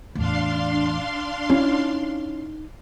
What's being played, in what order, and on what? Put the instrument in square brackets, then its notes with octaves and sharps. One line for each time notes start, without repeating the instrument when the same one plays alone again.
[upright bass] E2 A2 [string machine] D4 F5 C6
[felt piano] C#4 E4 [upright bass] D#4